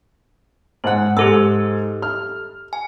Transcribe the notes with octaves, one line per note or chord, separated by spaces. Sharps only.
G#2 C5 F#5 F#6
G#2 G4 A4 E6
F6
G#5